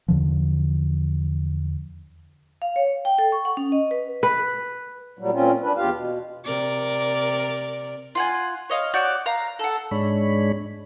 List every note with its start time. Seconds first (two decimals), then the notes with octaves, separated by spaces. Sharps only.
0.08 E2 D3 F3
2.62 F5
2.76 C#5
3.05 G5
3.18 A4
3.32 C#6
3.45 F#5
3.57 C#4
3.72 D#5
3.91 B4
4.23 B4
5.19 A#2 F#3 G3
5.33 A#2 C4 C#4 F4
5.62 D4 B4
5.77 E2 F4 G4 F5
5.93 B2
6.44 C3 A#4 D5
8.15 F4 F#5 G#5
8.70 C#5 D#5 F5
8.94 F#4 C#5 D5 G6
9.26 F5 A#5 F#6
9.59 A4 F#5
9.91 G#2 G#3 D4 C#5 B5